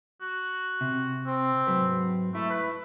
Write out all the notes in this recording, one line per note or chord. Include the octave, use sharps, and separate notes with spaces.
F#4
C3
C4
G#2 F#3 B4
A3 E4
B4